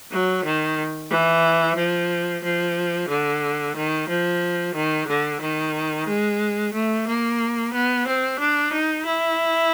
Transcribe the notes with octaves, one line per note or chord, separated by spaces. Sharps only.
F#3
D#3
E3
F3
F3
D3
D#3
F3
D#3
D3
D#3
G#3
A3
A#3
B3
C4
D4
D#4
E4